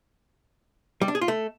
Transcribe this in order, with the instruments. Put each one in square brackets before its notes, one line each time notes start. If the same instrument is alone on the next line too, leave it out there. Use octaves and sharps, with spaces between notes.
[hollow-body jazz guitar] G3
D4
G#4
F4
A3